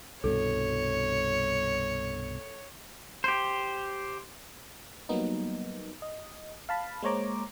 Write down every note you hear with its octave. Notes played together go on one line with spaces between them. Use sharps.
C2 G2 B2 A4 C#5
G4 C5
F#3 G3 A#3 B3 D#4
D#5
F5 A5 B5
G#3 A#3 C5 C#5 A#5 D6